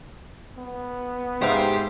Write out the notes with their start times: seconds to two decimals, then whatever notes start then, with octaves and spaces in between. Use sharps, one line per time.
0.58 B3
1.42 G#2 G4 C5 E5 F5